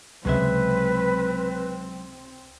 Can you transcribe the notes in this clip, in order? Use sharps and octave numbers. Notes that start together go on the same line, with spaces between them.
C#2 C3 F#3 G#3 C4 B4 E5